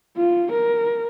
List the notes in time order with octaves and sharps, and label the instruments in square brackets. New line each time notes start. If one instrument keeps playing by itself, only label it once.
[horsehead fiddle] F4
A#4